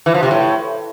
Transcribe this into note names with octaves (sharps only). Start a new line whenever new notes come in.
E3
F3
C3
A2